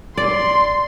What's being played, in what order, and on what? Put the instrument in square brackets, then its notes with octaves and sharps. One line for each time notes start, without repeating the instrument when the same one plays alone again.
[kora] D5 [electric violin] C6